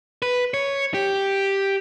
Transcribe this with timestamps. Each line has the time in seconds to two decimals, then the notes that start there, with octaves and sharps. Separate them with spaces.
0.22 B4
0.54 C#5
0.94 G4